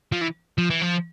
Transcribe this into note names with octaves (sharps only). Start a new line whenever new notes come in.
F3
E3
F3
E3
F3